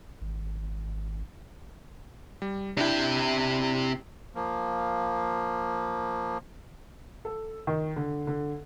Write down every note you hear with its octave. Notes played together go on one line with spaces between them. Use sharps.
G#1
G3
C3 D4 E4 G5
F3 A#3
A4
D#3
D3
D3